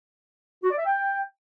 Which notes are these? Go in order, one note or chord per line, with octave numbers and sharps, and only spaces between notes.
F#4
D5
E5
G5